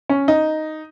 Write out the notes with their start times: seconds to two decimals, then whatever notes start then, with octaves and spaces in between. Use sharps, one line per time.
0.09 C#4
0.28 D#4